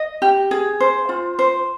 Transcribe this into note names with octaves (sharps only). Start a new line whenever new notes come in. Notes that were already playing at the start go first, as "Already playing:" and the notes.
Already playing: D#5
G4
G#4
C5
F4
C5